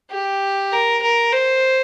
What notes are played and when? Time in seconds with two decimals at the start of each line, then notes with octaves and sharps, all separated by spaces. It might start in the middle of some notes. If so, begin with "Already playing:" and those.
0.11 G4
0.72 A#4
1.02 A#4
1.33 C5